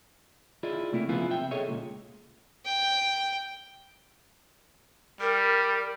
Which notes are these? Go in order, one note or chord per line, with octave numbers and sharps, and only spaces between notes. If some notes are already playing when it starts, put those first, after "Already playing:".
E4 F4 G#4 D5 D#5
C3 A3 A#3 E4
C#3 F3 B3 E4 F4 G#4
C3 E5 G5
G#4 A4 C#5 D#5 E5
C#2 A#2
G5
G3 A#4